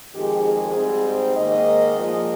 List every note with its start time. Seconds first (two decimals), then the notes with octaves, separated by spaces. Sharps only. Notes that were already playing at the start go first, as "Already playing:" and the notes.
0.14 F2 D#3 G#3 G4
0.45 G#4
0.75 G#2 G3 C4
1.36 G#2 D#3 A#3 D#5
1.96 A#2 F3 G#3